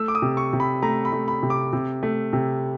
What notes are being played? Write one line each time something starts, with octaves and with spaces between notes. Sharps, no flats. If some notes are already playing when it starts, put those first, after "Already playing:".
Already playing: A3 E6
D6
D#6
C3
C#6
C3
B5
A3 A#5
B5
A3
B5
C3
D6
C3
A3
C3